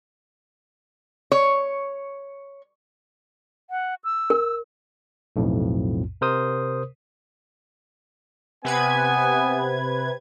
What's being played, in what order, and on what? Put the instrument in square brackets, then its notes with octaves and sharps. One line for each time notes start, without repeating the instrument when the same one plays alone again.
[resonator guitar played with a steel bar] C#5
[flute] F#5
E6
[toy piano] A#4
[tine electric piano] B1 F2 A2
C3 A#4 C5 D#6
[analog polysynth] C3 B4 G#6 [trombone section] B3 [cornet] G#5